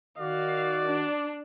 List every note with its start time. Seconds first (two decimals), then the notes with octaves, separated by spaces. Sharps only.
0.19 D#3 F#4 D5 F5
0.85 D4